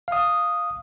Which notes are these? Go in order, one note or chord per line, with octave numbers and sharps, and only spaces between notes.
F5 D#6